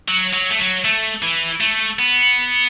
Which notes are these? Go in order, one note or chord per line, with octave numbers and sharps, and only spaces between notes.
F#3
F#3
A3
F#3
A3
E3
A3
B3